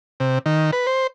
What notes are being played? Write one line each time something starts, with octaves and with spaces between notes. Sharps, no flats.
C3
D#3
B4
C5